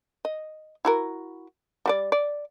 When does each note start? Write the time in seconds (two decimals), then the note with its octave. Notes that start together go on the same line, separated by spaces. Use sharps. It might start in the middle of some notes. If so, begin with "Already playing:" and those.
0.25 D#5
0.85 E4 F#4 A#4
1.86 G3 G4 D5
2.12 D5